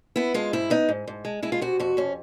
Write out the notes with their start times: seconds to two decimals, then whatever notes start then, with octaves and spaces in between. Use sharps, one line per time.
0.16 B3 E4
0.34 G#3 F4
0.53 G#2 E4
0.70 B3 D#4
0.89 G#2
1.08 G#2
1.25 G#3
1.43 G#3 E4
1.52 F4
1.61 C3 F#4
1.79 F2 F#4
1.97 F2 C#4